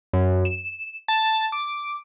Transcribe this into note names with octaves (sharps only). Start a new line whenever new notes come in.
F#2
E7
A5
D6